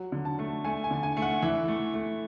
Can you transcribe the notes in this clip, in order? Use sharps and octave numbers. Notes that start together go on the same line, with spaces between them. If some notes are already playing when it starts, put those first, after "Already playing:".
Already playing: F#3 F#5
D3
A5
A3
A3 G#5
G#5
D3
G#5
A3
F#5
E3 E5
A3
A3